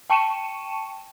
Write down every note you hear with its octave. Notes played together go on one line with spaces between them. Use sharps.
G5 A5 C#6 C#7 D#7 E7